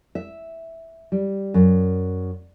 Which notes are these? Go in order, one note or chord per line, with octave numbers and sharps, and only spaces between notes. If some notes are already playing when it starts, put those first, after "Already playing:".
E5
G3
F#2